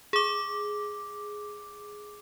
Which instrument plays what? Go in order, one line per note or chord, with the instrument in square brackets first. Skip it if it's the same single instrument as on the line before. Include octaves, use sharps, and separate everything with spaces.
[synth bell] G#4 D6